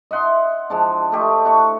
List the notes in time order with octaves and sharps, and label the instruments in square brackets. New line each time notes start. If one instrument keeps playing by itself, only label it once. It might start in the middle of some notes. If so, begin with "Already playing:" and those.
[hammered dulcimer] D#5 E5 F#5 C6
F3 G#3 D4
A3 G4 D#5
D4 F#4 C#6